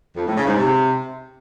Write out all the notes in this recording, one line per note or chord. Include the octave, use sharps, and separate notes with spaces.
F2
A2
C#3
G#2
C3